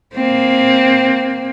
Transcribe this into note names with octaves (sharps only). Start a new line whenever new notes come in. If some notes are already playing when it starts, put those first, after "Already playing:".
A#3 C4